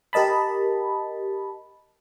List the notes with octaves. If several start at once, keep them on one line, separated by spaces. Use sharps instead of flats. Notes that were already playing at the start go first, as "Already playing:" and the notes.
G4 A#4 D#5 A5 B5